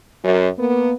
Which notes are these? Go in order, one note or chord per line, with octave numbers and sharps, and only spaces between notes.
F#2
A#3 B3